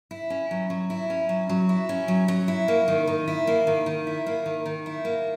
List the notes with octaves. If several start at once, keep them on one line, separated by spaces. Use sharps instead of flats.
E4
C#4
F#3
F#3
E4
C#4
F#3
F#3
E4
C#4
F#3
F#3
E4
A#3
D#3
D#3
E4
A#3
D#3
D#3
E4
A#3
D#3
D#3
E4
A#3